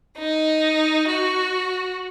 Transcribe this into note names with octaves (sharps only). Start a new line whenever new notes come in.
D#4
F#4